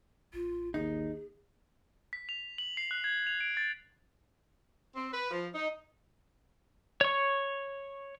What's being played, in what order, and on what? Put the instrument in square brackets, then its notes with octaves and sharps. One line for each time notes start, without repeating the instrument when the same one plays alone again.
[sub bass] A1 [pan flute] F4
[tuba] D#2 [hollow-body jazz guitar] D#4 [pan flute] G#4
[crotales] B6
F7
F#7
C7
F#6
G#6
F7
D7
A6
[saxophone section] C4
B4
F3
D#4
[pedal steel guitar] C#5 C#6